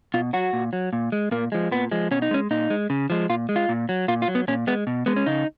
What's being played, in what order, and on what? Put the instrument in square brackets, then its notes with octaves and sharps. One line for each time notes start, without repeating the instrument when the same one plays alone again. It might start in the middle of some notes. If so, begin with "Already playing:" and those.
[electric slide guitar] B2 F4
F#3 F#4
A#2
F#3
A#2
G#3
A#2 A#3
F3 G#3
A#2 B3
F3 G#3
B2 C#4
D#4
G#3 C#4
A#2 D#4
G#3
C#3
F3 G#3
A#2 F4
G#3
F4
A#2
F#3
A#2 F4
F4
F#3
B3
A#2 C#4
G#3 B3
B2
G#3 B3
C#4
C#3 D#4